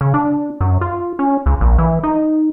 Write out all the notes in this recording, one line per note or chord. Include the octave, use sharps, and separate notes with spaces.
C#3
D4
F#2
F4
C#4
C#2
A#1
E3
D#4